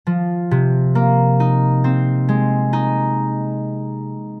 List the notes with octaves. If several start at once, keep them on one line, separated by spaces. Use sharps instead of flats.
F3
C3
A#3
D#4
C4
G#3
D#4